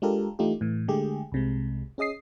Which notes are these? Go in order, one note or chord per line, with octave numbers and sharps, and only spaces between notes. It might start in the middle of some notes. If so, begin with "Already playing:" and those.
G#3 D4 F4 G4 A4 A#4
E3 A3 D#4 F4 G4
A2 E3
D3 G#3 A3 G4 G#4
C2 C3 G#3
C#4 G#4 D#5 D#6 C7